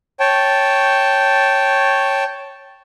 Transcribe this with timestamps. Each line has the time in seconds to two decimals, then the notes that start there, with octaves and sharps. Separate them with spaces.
0.20 C#5 G5 A5